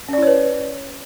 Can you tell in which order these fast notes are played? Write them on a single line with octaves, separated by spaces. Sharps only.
C#4 D5 E4 C#5 B4